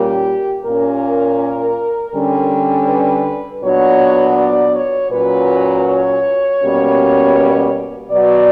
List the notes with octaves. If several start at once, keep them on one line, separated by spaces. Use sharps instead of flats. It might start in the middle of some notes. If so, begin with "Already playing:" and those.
Already playing: A#2 G3 A#3 C#4 G4
A#2 A#3 C#4 A#4
D3 G3 C#4
B4
A#2 F#3 B3 D4 C#5
D5
C#5
A#2 F#3 C#4 B4
C#5
B2 G3 A#3 C#4
B2 F#3 B3 D5